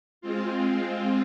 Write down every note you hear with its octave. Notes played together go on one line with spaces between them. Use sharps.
G#3 C4 F4